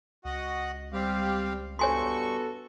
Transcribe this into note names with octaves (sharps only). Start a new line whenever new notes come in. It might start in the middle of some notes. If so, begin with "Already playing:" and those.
C#2 F#4 D#5 F#5
G3 C4 G4 F5
G2 B3 F#4 A4 C#5 G#5 C6 C#6